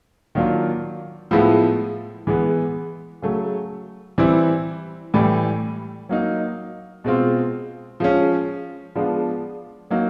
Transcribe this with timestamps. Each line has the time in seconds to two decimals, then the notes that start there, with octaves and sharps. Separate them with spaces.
0.35 D#3 F#3 A#3 D4 F4
1.31 A2 F3 G#3 B3 E4
2.27 E3 G#3 B3
3.22 C#3 F#3 A3
4.18 E3 G3 C4 E4
5.14 A2 E3 G3
6.09 F#3 A#3 D#4
7.04 B2 G#3 C4 F4
8.00 F3 G#3 C#4
8.95 F3 G#3 B3 D4 F4
9.90 F#3 A#3 D#4